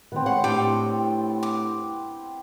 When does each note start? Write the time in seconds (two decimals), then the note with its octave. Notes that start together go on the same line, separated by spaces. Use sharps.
0.12 A2 D#3 B3 C4
0.26 G#3 C#5 F#5 C6
0.44 A2 D4 F4 G4 G5 A5 D6
1.43 D6